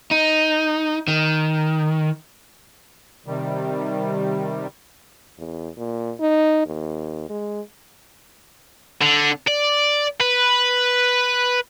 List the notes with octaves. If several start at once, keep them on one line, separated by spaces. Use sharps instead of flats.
D#4
D#3
C3 D#3 G3
E2
A#2
D#4
D#2
G#3
D3
D5
B4